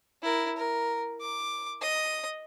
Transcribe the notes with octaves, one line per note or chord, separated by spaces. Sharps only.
E4 A#4
A#4
D6
D#5 D#6